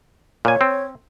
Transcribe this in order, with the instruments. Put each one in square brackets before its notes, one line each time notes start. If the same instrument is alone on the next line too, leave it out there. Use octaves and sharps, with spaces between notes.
[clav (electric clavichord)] A#2 G#5 [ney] C#5
[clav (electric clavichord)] C4